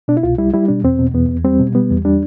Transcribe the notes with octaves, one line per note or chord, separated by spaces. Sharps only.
B2 D4
E4
C2 F4
G3 E4
G3 E4
B2 D4
E2 C4
B2
E2 B3
E2
G3 C4
B2
G3 B3
E2
G3 D4